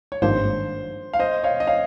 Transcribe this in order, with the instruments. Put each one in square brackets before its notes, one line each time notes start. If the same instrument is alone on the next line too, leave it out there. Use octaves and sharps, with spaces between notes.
[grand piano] C#5
[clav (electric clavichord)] G#1 G2 F3 A#3 D#4 [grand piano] C5
[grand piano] F5
C5 D#5
C#5 F5
D#5
C#5 F5